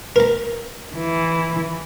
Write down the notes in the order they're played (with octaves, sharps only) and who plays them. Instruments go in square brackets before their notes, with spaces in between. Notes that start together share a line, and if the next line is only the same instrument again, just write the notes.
[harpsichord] A#4 A#5
[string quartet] E3